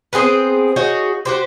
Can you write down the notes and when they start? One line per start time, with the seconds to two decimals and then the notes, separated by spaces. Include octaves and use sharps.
0.13 B3 C4 G#4 C5
0.76 D#4 F#4 G#4 C#5
1.25 F#4 G4 C5